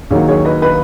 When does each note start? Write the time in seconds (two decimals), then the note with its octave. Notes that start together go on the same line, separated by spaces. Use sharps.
0.11 D#2 D#3 F#3 G#4 C#5
0.28 G#4 C#5
0.45 B4 D#5
0.62 B4 D#5